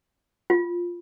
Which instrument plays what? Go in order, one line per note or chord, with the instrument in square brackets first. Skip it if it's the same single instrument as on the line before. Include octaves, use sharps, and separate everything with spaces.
[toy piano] F4